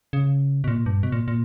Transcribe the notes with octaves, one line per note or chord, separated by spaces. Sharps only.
C#3
B2
A#2
G2
B2
A#2
A#2